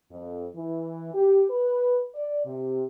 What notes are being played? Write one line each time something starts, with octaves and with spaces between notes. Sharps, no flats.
F2
E3
G4
B4
D5
C3